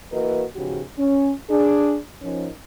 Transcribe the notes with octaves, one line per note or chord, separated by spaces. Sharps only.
E3 A#3 F#4 A#4 B4 D#5
E2 G#2 C#3 F3 F#4 G4
C#4
D4 G#4
D#3 F3 C#4